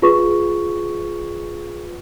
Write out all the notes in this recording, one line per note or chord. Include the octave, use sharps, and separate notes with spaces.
F4 G#4 B4 C#6